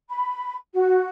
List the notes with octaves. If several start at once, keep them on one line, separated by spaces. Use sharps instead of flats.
B5
F#4